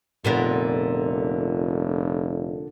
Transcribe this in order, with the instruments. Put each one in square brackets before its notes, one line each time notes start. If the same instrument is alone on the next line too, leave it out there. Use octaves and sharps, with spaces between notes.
[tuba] F1 [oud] A#2 D3 B3